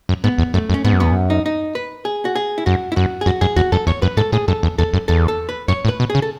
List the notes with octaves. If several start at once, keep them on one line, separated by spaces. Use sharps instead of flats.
F#2
G#2 B3
E2
F#2 A3
F#2
C#4
G#2 B3
F#2
E2 B3
F#2
D#4
D#4
B4
G#4
F#4
G#4
E4
F#2 F#4
E4
F#2 F#4
G#4
F#2 F#4
F#2 G#4
E2 F#4
F#2 A4
E2 C#5
F#2 B4
G#2 A4
A2 G#4
F#2 A4
E2
E2 A4
F#2
E2 A4
A4
B4
F#2 C#5
A2
B4
B2
G#4
C#3
A4